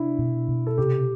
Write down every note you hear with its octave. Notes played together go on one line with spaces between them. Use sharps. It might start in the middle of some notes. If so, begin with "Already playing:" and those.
Already playing: C3 D4 E4
B2
B2
A4
C3 G4